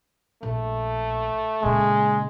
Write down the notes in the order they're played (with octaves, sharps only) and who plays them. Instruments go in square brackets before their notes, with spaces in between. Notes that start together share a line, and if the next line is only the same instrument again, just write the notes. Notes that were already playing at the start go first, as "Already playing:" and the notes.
[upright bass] A#1 [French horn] A3
[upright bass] A#2 C#3 [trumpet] G#3